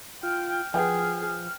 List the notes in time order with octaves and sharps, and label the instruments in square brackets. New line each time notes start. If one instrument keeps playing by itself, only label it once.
[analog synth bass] F4 [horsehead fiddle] G5 [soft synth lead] F6
[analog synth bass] F3 [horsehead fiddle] G#4 [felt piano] B4 F#5 G5